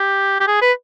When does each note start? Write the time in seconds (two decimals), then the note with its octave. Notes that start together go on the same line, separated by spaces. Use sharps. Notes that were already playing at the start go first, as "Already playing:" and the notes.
Already playing: G4
0.40 G4
0.47 G#4
0.62 B4